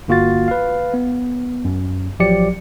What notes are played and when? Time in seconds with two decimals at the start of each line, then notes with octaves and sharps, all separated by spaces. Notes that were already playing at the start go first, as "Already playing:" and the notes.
0.08 G1 A#3 F4 F#4 F5 A6
0.48 B4 F5
0.94 B3
1.65 F#2
2.20 A1 F3 F#3 G4 D5 C#7